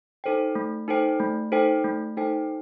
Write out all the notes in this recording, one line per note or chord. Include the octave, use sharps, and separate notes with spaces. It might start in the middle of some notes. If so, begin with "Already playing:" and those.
D#4 A4 C5 G5
A3
D#4 A4 C5 G5
A3
D#4 A4 C5 G5
A3
D#4 A4 C5 G5